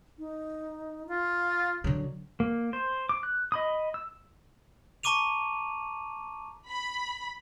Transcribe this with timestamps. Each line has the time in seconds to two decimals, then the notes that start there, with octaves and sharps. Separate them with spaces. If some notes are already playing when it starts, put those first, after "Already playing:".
0.19 D#4
1.09 F4 F5
1.84 D3 F#3
2.40 A#3
2.73 C5
3.09 D6
3.23 F#6
3.52 D#5 B5 D#6
3.94 E6
5.03 A5 A#5 C#6 D6 D#7 F7
6.69 B5